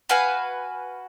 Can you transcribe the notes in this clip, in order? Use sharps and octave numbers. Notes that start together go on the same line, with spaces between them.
F#4 B4 F5 G#5